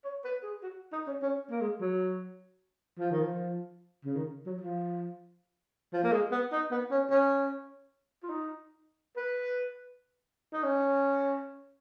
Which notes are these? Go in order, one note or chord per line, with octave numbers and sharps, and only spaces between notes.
C#5
B4
G#4
F#4
D#4
C#4
C#4
A#3
G#3
F#3
F3
D#3
F3
C#3
D#3
F#3
F3
F3
A#3
G#3
B3
D#4
B3
C#4
C#4
F4
D#4
B4
D#4
C#4